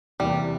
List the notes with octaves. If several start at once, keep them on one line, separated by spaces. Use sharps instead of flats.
E2 C3 E3 G3 A#3